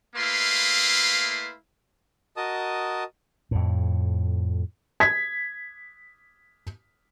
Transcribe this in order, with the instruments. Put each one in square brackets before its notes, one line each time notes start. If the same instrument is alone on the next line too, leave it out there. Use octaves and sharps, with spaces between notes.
[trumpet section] A3 A#3 E4 B4 F5 C6
[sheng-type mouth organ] F#4 A#4 D#5 A5 D#6
[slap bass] F2 A2
[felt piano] G#6 B6